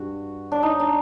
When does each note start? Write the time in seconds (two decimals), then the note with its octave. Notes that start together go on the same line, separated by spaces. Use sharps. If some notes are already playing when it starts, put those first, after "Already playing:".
Already playing: G2 F#4
0.52 D4
0.63 D#4
0.80 D4